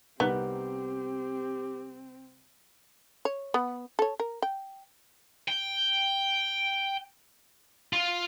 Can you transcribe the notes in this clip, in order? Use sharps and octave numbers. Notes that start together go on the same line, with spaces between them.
C2 B3 C4 D#4 G4 A#4
C#5
B3
A4 C#5
A#4
G5
G5
F4